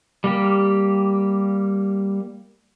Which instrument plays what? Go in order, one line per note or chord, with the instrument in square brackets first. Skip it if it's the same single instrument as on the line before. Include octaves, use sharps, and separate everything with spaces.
[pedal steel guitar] G3 A#3 G4